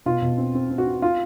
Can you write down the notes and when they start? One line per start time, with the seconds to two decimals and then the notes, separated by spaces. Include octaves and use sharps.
0.06 B2 F4
0.22 B2
0.37 C4
0.55 C4
0.70 C4
0.78 F#4
0.86 C4
1.02 F4